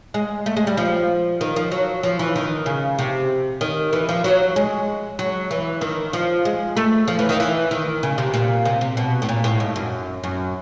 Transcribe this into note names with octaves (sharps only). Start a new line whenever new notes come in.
G#3
A3
G#3
G3
F3
D#3
F3
F#3
F3
E3
D#3
C#3
C3
D#3
E3
F3
F#3
G#3
F#3
E3
D#3
F3
G#3
A3
F3
E3
D#3
E3
D#3
C#3
C3
A#2
C3
C3
B2
A2
A#2
A2
G#2
F#2
F#2